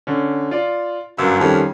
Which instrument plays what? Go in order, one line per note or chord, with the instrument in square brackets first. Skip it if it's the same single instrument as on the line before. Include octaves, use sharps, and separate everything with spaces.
[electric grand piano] D3 C#4
F4 D5
[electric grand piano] G1 F5 E6 [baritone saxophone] F#2
[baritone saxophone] F2 [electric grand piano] D#3 G3 C#4